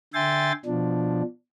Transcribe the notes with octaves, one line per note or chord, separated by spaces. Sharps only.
D3 E5 G5 G#5 C6 A6
B2 F3 D4